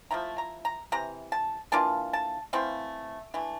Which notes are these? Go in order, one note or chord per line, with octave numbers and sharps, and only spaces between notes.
F3 A3 E4 A#5
A#5
A#5
C3 E3 A#5
A5
E3 A#3 D4 F4 A5
A5
E3 A3 C4 E4 F5
E3 A3 D4